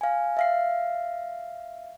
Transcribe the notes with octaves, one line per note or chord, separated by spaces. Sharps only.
F5 G#5
E5 F5 C7